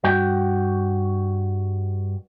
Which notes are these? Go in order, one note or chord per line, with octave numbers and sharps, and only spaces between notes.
G2 F#4 G5